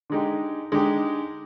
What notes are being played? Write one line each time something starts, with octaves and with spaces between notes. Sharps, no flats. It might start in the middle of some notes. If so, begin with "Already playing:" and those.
D3 G#3 D#4 G4
D3 G#3 D#4 G4